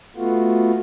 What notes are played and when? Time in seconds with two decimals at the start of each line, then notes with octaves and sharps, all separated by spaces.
0.16 A3 B3 F4 F#4